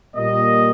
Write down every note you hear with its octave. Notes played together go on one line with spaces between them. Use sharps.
A#2 G3 A#3 D#5